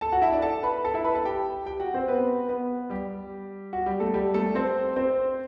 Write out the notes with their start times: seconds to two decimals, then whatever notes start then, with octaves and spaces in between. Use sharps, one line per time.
0.01 A4 A5
0.12 F#4 F#5
0.22 E4 E5
0.32 D4 D5
0.42 A4 A5
0.63 B4 B5
0.84 A4 A5
0.94 E4 E5
1.04 B4 B5
1.14 A4 A5
1.25 G4 G5
1.66 G4 G5
1.80 F#4 F#5
1.94 C4 C5
2.07 B3 B4
2.48 B3 B4
2.90 G3 G4
3.73 F#4
3.86 G3 G4
4.00 A3 A4
4.14 G3 G4
4.34 A3 A4
4.55 C4 C5
4.96 C4 C5